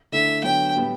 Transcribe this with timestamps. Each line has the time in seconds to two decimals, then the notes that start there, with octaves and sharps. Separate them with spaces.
0.12 D3 A3 E4 E5
0.44 D3 F#3 B3 G5
0.75 A2 G3 B3